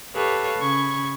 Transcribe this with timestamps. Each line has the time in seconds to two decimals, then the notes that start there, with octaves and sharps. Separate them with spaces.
0.14 G4 A4 B4 C#5 F5
0.59 C#3 B5 C#6 G#6